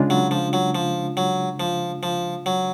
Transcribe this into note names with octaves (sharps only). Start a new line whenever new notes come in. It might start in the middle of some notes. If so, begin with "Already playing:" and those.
Already playing: C#3 G#3 D4 F4
F#3
F3
F#3
F3
F#3
F3
F3
F#3